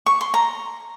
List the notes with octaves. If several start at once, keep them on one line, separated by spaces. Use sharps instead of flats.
C#6
C6
A#5